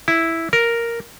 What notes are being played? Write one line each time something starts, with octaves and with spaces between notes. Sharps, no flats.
E4
A#4